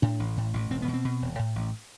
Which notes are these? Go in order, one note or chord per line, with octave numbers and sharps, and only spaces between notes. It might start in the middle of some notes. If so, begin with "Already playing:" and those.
A2 D4
A1
A2
A1
E1 C4
B3
B2
C4
B2
E1
A2
A1